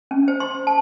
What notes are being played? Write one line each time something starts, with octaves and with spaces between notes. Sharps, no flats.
C#4
C5
C6
A5